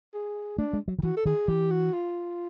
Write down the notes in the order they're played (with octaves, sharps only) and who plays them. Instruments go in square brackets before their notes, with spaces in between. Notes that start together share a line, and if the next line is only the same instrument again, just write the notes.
[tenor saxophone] G#4
[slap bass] A3 [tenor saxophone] D4
[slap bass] G#3
F#3
D#3
[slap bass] E3 [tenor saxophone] F#4
[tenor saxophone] A4
[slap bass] D#3 [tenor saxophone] G#4
[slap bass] E3 [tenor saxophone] G4
[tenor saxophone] F#4
F4